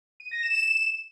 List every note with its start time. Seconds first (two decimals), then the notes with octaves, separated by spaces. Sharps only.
0.20 D#7
0.31 A#6
0.43 E7